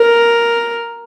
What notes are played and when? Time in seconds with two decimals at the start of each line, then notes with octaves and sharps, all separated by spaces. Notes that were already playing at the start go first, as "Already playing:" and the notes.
Already playing: A#4